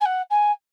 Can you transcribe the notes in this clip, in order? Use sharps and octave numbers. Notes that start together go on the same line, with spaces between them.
G#5
F#5
G#5